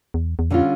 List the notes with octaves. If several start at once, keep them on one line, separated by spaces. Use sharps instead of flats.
E2
E2
F2 D3 G3 C#4 F4